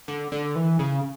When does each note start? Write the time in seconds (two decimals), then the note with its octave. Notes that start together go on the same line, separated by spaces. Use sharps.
0.08 D3
0.32 D3
0.56 E3
0.79 C#3